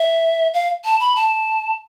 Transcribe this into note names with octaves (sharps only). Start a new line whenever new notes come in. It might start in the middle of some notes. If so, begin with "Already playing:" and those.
Already playing: E5
F5
A5
B5
A5